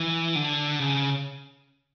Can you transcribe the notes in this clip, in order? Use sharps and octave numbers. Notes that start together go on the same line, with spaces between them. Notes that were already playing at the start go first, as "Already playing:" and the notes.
Already playing: E3
D3
C#3